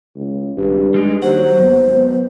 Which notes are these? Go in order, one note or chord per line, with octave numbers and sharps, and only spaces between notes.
C#2
G#1 G2
G3 G#3 D4 D#4
D#2 F#3 C5 F#5
G#1 F#3 B3
B3